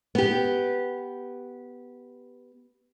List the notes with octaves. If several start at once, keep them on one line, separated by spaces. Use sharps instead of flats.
B3 G4